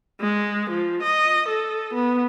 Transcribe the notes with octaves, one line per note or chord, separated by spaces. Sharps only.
G#3
F3
D#5
A4
B3